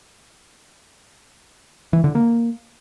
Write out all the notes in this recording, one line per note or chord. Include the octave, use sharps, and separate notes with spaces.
E3
D3
A#3